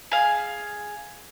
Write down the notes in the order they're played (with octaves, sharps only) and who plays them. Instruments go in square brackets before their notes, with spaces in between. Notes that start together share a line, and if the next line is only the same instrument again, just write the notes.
[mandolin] G#4 F5